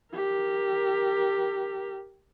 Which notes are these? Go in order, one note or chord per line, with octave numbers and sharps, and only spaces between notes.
G4 A#4